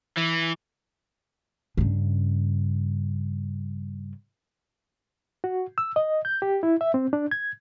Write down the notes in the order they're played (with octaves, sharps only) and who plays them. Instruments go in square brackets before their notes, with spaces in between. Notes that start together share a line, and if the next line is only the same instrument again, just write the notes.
[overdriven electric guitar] E3
[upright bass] G2 C#3
[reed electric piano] F#4
E6
D#5
G6
G4
E4
E5
C4
D4
G#6